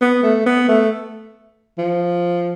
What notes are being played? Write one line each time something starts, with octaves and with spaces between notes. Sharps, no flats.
B3
A3
B3
A3
F3